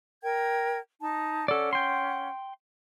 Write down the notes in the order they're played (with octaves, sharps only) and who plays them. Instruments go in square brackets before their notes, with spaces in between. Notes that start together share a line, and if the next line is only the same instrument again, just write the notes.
[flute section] A#4 G5 G#6
D#4 A5
[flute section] C#4 F#5 [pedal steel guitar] A4 D5
[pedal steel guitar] G5 C6